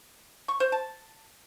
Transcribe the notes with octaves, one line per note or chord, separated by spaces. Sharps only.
C#6
C5
A5